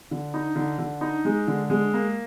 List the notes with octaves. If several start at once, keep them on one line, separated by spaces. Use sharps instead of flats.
D3
D#4
D3
D3
D#4
G#3
D3
G#3
A#3